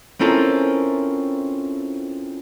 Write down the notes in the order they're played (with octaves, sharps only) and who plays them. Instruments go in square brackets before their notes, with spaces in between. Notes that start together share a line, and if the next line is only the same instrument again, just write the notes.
[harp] C4 C#4 E4 F4 A4 A#4